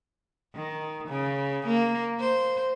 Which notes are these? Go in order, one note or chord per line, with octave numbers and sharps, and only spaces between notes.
D#3
C#3
A#3
C5